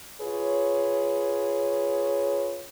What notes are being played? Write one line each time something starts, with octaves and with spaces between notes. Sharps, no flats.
F4 G#4 B4 C#5